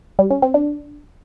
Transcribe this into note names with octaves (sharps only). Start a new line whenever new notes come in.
G3
C#4
C4
D4